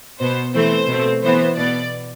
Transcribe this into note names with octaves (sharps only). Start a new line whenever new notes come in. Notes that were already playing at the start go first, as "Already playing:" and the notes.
B2 B3 C5
E3 A3 C4 C5
B2 A3 C4
E3 B3 C5
B2 B3 D5